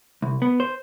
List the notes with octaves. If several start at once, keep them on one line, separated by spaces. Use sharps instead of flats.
C2
B3
C5